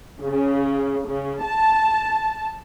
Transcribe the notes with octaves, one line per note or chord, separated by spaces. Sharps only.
C#3
C#3
A5